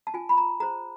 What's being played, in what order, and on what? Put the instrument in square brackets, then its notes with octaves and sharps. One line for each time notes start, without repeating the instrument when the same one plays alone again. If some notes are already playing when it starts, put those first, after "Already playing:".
[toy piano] A5
F4 G#5
B5
A#5
G#4 C5 A#5